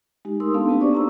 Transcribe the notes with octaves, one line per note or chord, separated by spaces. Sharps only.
G#3 D#4 G4
A3 D#4 A#4 C6 D#6 E6
B3 C#4 D4 A4 F5 A5
C4 D4 F#4 G4 B4
A#3 D#4 C5 D5 C#6 D6
C#4 A#5 E6